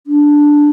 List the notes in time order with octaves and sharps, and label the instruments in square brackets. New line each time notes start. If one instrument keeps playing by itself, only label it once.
[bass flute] D4